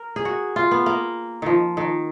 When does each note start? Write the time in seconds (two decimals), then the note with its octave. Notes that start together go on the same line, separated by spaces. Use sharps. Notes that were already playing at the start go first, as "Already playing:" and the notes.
Already playing: A#4
0.16 G#4
0.25 F#4
0.56 F4
0.71 B3
0.86 A#3
1.42 D#3 F3
1.77 D#3